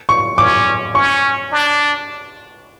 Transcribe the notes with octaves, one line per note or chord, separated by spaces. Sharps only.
C#6
C#4 D6
C#4 C#6
D4